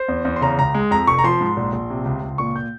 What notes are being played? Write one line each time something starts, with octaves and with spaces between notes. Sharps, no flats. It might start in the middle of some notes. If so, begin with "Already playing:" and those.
Already playing: C5
E2
E2
C6
C#3 A#5
C#2 A#5
G#3
F2 A#5
F1 C#6
A#5
F3 C6
G#2
A#1
A#1
C3
C#2
C#2
A#2 C#6
G6